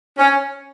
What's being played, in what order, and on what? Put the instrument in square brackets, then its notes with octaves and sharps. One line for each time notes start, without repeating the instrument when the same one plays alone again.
[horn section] C#4